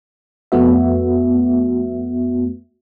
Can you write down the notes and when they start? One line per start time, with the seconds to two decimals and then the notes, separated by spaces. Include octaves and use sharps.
0.52 F2 A3 B3 F#4 E5